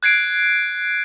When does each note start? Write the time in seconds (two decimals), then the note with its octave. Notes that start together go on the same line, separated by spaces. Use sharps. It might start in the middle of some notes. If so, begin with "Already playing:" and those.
0.03 F#6 G#6 C7 D7